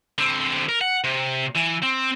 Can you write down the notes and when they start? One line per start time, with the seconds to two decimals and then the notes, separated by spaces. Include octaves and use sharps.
0.18 D3 C4
0.69 A#4
0.81 F#5
1.04 C3
1.56 E3
1.83 C4